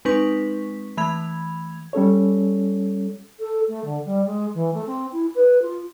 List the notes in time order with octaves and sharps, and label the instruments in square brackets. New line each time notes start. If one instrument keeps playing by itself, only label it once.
[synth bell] G#3 C4 D#4 B4 C#6 B6
E3 A3 B5 G#6 F7
[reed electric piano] G3 C#4 A4 C#5
[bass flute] A4
A3
D3
G3
G#3
E3
A3
C4
E4
B4
F4